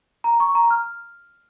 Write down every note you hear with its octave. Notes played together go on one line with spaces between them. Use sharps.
A#5
C#6
A#5
F6